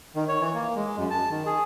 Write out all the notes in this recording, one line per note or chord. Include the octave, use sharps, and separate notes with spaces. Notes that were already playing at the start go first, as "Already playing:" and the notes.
D#3
C#5
E3
A#3
G#3
F#2
A5
D#3
G#4